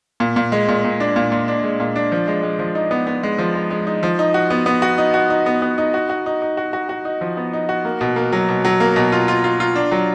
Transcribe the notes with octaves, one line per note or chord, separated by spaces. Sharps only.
A#2
A#2
G#3
A#2
A#2
D4
A#2
A#2
D4
G#3
A#2
D4
F3
G#3
G#3
F3
D#4
B3
B3
G#3
F3
G#3
G#3
D#4
F3
D#4
F#4
B3
B3
F#4
D#4
F#4
D#4
B3
B3
D#4
F#4
F#4
D#4
D#4
F#4
F#4
F#4
D#4
F3
B3
D#4
F#4
A#3
B2
A#3
F#3
B2
F#3
A#3
B2
F4
F4
F4
F4
D4
F#3